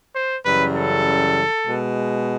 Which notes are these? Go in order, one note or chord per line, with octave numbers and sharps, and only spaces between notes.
C5
F#2 C#3 E3 G3 B4
A4
B2 G#3